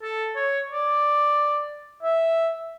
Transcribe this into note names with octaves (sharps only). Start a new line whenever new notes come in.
A4
C#5
D5
E5